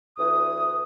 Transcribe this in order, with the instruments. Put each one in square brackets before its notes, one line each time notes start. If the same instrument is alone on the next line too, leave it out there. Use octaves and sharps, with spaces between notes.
[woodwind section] D2 E3 D#6